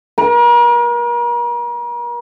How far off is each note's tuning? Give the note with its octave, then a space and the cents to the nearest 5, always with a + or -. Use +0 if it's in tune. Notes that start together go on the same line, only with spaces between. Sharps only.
A#4 +40